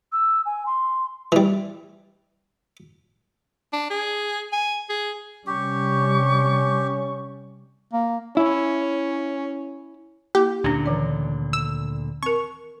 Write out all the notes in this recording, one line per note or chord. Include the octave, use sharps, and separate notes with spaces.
E6
G#5
C6
E3 G3
D4
G#4
G#5
G#4
C3 G3 C#4 G4 C#6
A#3
C#4 E4
A#3 E4 G4
D2 A#2 D3 C#4 D4
D#3 E3 D5
E6
C4 A#4 C#6